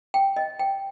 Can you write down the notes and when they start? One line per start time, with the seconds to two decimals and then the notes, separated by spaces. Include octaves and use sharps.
0.14 G5
0.37 D#5
0.59 G5